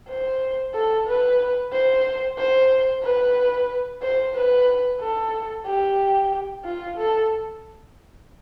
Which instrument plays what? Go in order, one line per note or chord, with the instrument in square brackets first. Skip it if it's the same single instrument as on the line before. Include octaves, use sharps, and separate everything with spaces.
[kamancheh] C5
A4
B4
C5
C5
B4
C5
B4
A4
G4
F4
A4